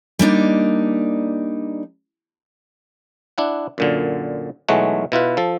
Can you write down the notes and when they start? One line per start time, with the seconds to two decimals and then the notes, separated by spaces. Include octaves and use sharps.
0.19 G3 A#3 D4 D#4
3.38 D4 E4 F#5
3.78 F#2 A#2 D3
4.68 B1 E3 G#3 A3 C#5 F#5
5.12 B2 E4 F4 B4
5.37 F3 A4